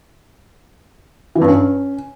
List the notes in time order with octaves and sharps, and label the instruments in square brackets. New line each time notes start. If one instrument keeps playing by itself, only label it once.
[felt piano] E3
G2
C#4